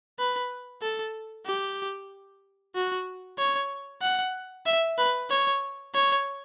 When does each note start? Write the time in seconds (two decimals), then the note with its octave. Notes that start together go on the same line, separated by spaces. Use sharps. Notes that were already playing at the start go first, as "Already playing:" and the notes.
0.19 B4
0.82 A4
1.46 G4
2.75 F#4
3.38 C#5
4.02 F#5
4.66 E5
4.98 B4
5.30 C#5
5.94 C#5